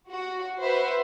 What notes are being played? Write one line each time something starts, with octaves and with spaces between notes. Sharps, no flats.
F#4
B4 C5 E5 F#5